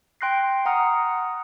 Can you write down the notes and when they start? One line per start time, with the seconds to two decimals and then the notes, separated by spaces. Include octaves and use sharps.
0.21 G5 C6 F#6 A#6 C7
0.66 F#5 A#5 D#6 F6